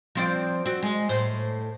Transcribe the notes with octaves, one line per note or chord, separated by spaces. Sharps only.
F3 C4 D5
C4 F#4
G#3
A2 C5